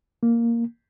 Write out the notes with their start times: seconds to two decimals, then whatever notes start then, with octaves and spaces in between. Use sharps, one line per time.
0.23 A#3